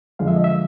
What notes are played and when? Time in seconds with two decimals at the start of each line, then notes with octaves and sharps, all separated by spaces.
0.19 F2 D3 F3 G#3 F5
0.27 E5
0.36 D#5
0.44 E5